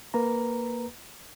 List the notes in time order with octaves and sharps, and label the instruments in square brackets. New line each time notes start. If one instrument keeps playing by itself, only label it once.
[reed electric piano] A#3 B4 A#5